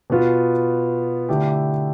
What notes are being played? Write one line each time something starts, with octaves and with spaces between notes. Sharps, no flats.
B2 B3 F4
D3 A3 E4 G4